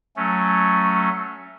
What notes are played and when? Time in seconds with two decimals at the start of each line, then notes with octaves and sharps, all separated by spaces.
0.16 F#3 A3 C#4